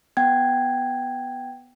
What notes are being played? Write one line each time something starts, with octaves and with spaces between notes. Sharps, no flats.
B3 F#5 G5 G#6